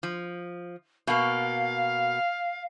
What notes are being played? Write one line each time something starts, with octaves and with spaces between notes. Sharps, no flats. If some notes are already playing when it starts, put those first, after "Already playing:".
F3
B2 A#3 F5